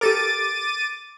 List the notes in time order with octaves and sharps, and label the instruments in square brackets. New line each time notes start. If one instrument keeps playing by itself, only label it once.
[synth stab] G4 A4 A#4 [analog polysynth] D6 A6 D#7